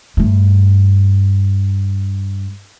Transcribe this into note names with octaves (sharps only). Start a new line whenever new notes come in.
G2 A3